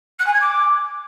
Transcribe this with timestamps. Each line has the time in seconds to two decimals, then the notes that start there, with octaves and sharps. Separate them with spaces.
0.19 F#6
0.26 G#5
0.33 G#6
0.40 D6